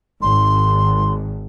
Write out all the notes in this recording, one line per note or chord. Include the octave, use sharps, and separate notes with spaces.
G#1 C6